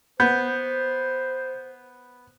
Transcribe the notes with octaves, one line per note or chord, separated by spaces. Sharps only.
B3 C5 G6